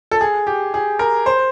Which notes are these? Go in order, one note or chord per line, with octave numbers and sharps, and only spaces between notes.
A4
G#4
G4
G#4
A#4
C5